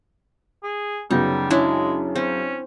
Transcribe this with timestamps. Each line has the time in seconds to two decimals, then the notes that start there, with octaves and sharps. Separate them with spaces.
0.64 G#4
1.11 F#2 C#3 G3 B3 D#4
1.50 G#3 C#4 D4 E4
2.16 C4 C#4